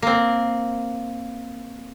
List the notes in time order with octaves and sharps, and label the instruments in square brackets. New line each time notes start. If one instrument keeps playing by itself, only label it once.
[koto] A#3 C4